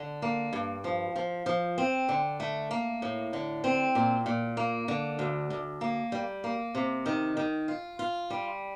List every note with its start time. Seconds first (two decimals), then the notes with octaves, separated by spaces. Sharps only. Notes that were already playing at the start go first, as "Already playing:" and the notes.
Already playing: D3
0.22 A#3
0.53 G2
0.84 F3
1.16 F3
1.46 F3
1.78 C4
2.09 D3
2.40 A3
2.71 A#3
3.02 A2
3.33 D3
3.64 C4
3.95 A#2
4.26 A#2
4.57 A#3
4.88 D3
5.19 D2
5.50 D2
5.81 A#3
6.12 G3
6.44 A#3
6.75 C3
7.06 D#3
7.37 D#3
7.68 F4
7.99 F4
8.30 G3